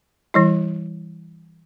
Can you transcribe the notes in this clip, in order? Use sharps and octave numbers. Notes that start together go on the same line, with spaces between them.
E3 G3 E4